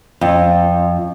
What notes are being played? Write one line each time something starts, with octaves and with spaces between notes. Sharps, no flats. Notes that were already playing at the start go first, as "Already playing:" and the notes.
F2